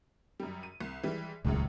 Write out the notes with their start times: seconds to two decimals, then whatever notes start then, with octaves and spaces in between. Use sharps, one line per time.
0.40 F#2 G3
0.63 D#7
0.81 C2
1.03 E3 G3 G#3
1.45 D#1 C#2 F#2 A2 G#3